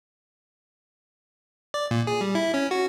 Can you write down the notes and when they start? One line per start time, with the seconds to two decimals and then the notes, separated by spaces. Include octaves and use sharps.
1.74 D5
1.91 A#2
2.07 G#4
2.21 G3
2.35 E4
2.54 C#4
2.71 F#4